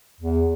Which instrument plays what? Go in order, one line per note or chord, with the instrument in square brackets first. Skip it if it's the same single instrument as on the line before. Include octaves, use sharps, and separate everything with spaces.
[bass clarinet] E2